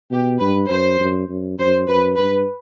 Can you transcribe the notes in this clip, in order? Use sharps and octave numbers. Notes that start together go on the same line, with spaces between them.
B2 G4
G2 B4
F#2 C5
F#2
F#2
F#2 C5
F#2 B4
G2 B4